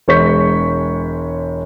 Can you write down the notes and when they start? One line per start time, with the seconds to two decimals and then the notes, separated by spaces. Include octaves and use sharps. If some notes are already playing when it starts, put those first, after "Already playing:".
0.08 E1 G#3 C#5 C#6 G6 B6